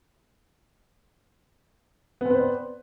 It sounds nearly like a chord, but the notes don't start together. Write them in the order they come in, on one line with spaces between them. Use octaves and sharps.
B3 C4 B4 C5 D5